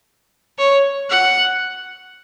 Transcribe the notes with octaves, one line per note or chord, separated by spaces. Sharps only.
C#5
F#5